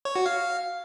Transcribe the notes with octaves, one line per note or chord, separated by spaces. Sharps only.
C#5
F#4
F5